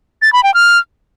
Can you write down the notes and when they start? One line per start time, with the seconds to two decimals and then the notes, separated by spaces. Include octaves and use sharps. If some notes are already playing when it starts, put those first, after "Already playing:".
0.22 A6
0.33 B5
0.43 G5
0.54 F6